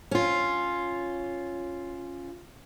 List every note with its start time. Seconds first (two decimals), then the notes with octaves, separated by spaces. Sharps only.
0.11 C#4 F4